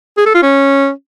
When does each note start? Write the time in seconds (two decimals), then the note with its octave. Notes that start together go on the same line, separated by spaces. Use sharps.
0.17 G#4
0.26 A4
0.34 F4
0.43 C#4